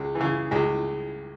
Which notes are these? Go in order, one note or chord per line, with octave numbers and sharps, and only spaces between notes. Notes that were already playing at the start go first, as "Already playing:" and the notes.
Already playing: C#2 G#3
E3
C#3
C#2 G#3